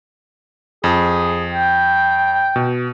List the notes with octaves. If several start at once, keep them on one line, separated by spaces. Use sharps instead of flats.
F2 G#4
G5
B2